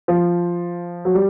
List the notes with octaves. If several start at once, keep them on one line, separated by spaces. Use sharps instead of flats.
F3
F#3
G3